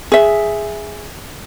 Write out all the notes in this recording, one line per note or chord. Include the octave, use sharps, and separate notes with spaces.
G#4 E5